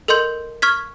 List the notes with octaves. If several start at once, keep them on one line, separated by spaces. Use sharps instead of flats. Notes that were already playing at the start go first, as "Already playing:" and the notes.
A4 A#4 D#5 C6 G6 F#7
C#6 F6 G#6 B6